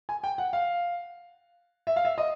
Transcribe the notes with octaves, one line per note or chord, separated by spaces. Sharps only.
G#5
G5
F#5
F5
E5
F5
E5
D#5